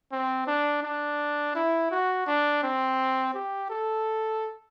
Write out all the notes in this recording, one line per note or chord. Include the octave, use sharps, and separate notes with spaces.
C4
D4
D4
E4
F#4
D4
C4
G4
A4